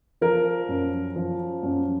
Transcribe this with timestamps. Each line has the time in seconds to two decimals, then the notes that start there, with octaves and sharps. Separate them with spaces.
0.21 F3 A#4
0.68 F#2
1.16 F3
1.63 F#2